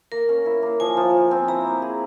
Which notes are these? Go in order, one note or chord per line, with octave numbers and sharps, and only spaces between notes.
A#3 A#4
C#4
E4
A#3
F3 G#5
F3
F3
C4
E4 A#5
A#3
G#4